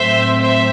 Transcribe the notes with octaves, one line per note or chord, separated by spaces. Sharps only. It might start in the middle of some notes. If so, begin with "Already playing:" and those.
Already playing: A2 F#3 A3 C4 C5 E5
C5 E5